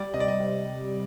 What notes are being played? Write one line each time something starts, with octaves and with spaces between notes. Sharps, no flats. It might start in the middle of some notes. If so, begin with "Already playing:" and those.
Already playing: G3 D5
C3 D#5
D5
D#5
C3